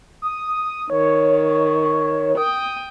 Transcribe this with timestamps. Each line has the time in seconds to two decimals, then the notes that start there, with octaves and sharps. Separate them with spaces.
0.22 D#6
0.90 D#3 C#5
2.37 G5 D#6